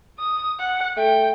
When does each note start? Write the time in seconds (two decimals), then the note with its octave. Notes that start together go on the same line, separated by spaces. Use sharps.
0.19 D#6
0.59 F#5
0.97 A3 G5